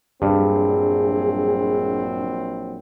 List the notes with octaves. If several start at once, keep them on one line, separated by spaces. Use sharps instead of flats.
A#1 G2 F#3 C4 G#4